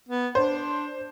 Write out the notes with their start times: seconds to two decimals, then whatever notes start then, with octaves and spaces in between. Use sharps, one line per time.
0.09 B3
0.35 D4 C5